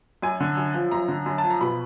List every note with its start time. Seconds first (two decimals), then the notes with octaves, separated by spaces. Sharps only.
0.22 F#2 G#5
0.40 D3
0.57 F#2
0.74 F3
0.91 F#2 A#5
1.08 D3
1.26 F#2
1.38 A5
1.43 F3
1.50 A#5
1.61 B2 B5